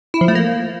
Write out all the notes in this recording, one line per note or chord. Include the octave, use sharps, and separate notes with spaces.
E4
F3
A3
A#3